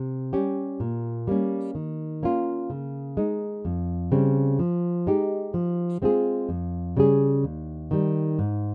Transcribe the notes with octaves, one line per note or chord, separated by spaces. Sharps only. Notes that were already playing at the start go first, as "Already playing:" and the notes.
Already playing: C3
G3 C#4 G4
A#2
G3 A#3 C#4
D#3
A#3 C#4 F4
C#3
G#3 D#4
F2
C#3 G3 C4
F3
G#3 D#4 G4
F3
G#3 C4 F4 G#4
F2
C#3 G3 C#4 G#4
D#2
D#3 G3
G#2